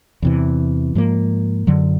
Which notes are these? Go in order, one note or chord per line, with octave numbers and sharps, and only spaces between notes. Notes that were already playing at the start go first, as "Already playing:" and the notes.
E2 C3 E3
G#2 F3 A#3
F#2 D3 F#3